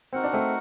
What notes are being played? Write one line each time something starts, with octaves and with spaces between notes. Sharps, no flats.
C4 D#4 F#4 A#4 F#5
D4
A3 C4